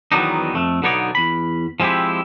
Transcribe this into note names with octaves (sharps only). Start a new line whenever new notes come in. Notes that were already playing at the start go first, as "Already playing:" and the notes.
E2 D#3 F#3 B3 D4 D#4
F2 A3
B1 D3 B3 D#4 C#5 D5
E2 B5
F3 G#3 C4 E4 G4